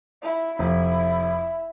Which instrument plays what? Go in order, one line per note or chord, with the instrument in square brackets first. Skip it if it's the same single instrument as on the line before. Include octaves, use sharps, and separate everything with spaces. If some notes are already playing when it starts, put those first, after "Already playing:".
[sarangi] E4
[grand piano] F1 [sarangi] E4